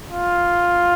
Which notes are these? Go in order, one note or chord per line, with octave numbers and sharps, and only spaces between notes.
F4